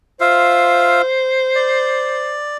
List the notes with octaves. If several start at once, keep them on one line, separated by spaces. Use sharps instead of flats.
F4 C5 E5 F5
D5